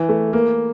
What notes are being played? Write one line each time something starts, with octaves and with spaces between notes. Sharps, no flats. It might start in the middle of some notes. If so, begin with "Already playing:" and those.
Already playing: E3
A3
A#3